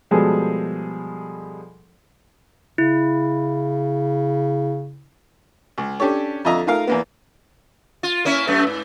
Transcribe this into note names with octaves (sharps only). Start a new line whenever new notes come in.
B2 F3 G3 G#3 G#4 A4
C#3 E4
C#2
C#4 D4 G4 A4 C#5
F2 D3 F4 D#5 E5 A#5
A3 D#4 F4 A#4 F5
E2 A#3 B3
F4
A#3 C#4 E4
F#2 A3 B3
G#2